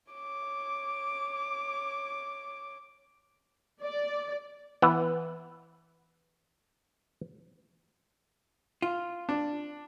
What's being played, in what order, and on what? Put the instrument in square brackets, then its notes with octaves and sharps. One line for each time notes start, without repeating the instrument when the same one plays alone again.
[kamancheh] C#5 D6
[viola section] D5
[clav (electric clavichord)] E3 B3 F#5
[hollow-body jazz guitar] F4
[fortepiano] D4